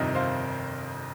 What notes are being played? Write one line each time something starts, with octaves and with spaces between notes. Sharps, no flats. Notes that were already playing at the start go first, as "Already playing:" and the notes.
Already playing: G1 F2 C3 D#3 A#4 D#5
C5 F5